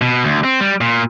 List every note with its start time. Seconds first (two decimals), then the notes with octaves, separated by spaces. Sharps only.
0.02 B2
0.25 D2
0.44 C4
0.60 G3
0.81 A#2